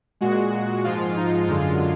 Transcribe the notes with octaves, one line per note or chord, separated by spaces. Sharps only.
A#2 G#3 F#4
G#2 F3 G#3 F4
D#4
F#2 D3 G#3 F4